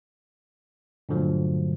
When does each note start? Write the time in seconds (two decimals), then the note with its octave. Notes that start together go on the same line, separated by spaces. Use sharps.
1.09 G2 A#2 D3 F3 F#3 A3